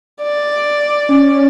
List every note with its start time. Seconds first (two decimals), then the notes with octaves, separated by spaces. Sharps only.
0.22 D5
1.09 C#4